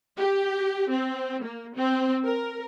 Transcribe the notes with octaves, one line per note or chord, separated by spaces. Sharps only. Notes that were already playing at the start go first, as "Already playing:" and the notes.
G4
C4
A#3
C4
A#4